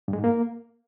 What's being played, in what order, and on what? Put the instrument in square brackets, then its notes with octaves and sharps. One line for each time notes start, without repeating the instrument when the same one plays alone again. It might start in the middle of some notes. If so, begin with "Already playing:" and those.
[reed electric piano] G2
G#3
G#2
A#3